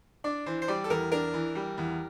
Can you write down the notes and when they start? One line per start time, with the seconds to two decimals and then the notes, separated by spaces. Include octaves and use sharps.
0.24 D4 D5
0.46 E3 C5
0.62 C5
0.68 G3 D5
0.84 A4
0.90 E2 A#4
1.12 D4 A#4
1.34 E3
1.55 G3
1.77 E2